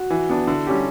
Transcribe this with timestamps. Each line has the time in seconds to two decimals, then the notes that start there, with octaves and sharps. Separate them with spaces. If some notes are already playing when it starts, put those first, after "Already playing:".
Already playing: F#4
0.10 E3
0.29 B3 D4
0.47 D3 E4
0.67 G3 C#4 G4